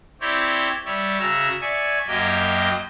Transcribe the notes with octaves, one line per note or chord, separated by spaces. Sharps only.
C4 E4 G4 C#5 D5
G3 C#5 D5 E5
C#3 F#4 E5 A#5 E6
D5 E5 G#5 C#6
F#2 F#3 A#3 G4 D#5 G5